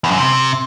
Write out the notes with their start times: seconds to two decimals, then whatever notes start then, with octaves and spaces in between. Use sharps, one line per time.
0.04 E2
0.11 F#2
0.18 C3